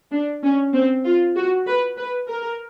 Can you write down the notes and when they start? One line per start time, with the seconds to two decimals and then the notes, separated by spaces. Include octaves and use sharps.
0.11 D4
0.43 C#4
0.74 C4
1.05 F4
1.36 F#4
1.67 B4
1.97 B4
2.28 A#4